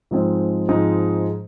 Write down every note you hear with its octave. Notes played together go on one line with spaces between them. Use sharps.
G#2 F3 G#3 C4 D#4
G#2 F3 G#3 C4 D#4